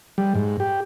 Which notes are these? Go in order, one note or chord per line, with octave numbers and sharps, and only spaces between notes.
G3
G#2
G4